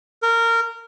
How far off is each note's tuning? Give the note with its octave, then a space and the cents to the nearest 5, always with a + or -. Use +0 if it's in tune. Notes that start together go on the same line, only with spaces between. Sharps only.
A#4 -20